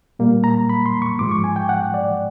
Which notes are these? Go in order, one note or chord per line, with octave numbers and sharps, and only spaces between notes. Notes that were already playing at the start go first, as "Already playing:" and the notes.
A#2 G3 A#3
A#5
B5
C6
C#6
G#2 F3 G#3 D6
C#6
G#5
G5
F#5
D5